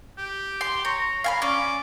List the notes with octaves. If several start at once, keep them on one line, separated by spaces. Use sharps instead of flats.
G4
C6
C#5 A#5
F5 G#5 B5
C#4 D5